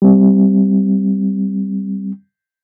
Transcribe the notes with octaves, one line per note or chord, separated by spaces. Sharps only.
G3 C4